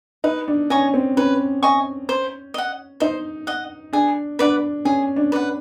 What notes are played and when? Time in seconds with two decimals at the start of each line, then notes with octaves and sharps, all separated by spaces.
0.24 D#4 B4
0.48 D4
0.70 C#4 D#5 G#5 C#6
0.94 C4
1.17 C#4 B4
1.63 D#5 G#5 C#6
2.09 C5
2.54 D#5 F#5
3.00 D#4 C5
3.47 D#5 F#5
3.93 D4 G#4
4.39 D4 B4 D5 F#5
4.85 C#4 G#4
5.16 D4
5.32 B4 D5
5.36 F#5